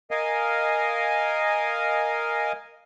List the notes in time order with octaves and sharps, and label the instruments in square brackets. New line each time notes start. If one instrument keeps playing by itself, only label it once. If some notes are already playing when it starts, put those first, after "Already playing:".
[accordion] A#4 D#5 F5 G#5